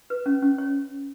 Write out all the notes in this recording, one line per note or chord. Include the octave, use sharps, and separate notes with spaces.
B4
C#4
C#4
C#5